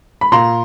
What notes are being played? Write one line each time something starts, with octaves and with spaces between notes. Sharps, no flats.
B5
A#2 A#5 C6